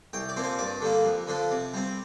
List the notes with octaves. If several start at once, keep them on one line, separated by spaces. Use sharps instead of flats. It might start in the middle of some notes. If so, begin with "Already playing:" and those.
C2 G5
D5
A#2 F3 C4
C5
G2 D5
D3 G3 A#3
F2
D3 F3 D4
C3
G3 C4